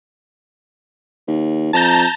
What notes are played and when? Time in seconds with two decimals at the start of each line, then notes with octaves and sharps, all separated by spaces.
1.27 D#2
1.73 F2 A5 A#5 G6